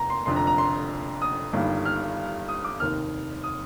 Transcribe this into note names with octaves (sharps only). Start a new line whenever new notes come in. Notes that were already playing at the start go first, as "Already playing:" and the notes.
Already playing: F1 D#2 A#5
C6
F1 F2 D3 C6
A#5
A#5
C6
D#6
G1 G2 D#3 G3
F6
D#6
D6
F1 D#2 D#3 F6
D#6